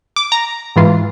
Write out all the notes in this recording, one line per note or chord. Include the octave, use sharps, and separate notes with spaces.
D6
A#5
G#2 E3 F4